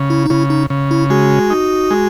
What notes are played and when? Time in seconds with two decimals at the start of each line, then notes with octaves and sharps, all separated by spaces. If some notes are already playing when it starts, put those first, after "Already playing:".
Already playing: C#3
0.10 E4
0.26 D#4
0.30 C#3 E4
0.50 D#4
0.70 C#3
0.91 E4
1.10 G#3 F#4
1.50 D#4
1.91 G#3